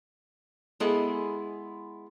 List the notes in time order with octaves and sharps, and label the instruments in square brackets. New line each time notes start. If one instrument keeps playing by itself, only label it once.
[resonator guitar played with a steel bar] G#3 B3 E4 G#4 A4 D#5